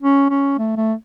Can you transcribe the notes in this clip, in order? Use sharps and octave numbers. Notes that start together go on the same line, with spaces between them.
C#4
C#4
A3
A3